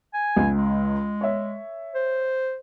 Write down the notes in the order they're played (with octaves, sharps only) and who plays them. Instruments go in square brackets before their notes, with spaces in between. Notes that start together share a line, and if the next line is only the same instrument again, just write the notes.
[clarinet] G#5
[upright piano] C#2
[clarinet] G#3
[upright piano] C#5 E5
[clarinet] C5